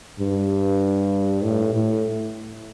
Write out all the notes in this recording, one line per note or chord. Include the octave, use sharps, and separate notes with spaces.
G2
A2
A2